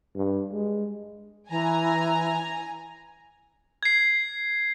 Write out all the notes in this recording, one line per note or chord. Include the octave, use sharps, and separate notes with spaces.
G2
G#3
E3 G#5 A#5
G#6 C7